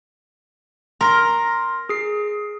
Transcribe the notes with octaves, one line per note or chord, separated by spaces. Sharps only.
A#4 C6 A#6
G#4 C7